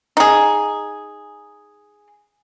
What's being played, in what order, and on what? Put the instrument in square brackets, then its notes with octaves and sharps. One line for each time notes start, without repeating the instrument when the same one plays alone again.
[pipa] D#4 G#4